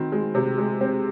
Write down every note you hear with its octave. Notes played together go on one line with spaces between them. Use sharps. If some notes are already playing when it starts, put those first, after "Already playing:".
Already playing: D#3 C4 F#4
G#3
C3
G#3
C4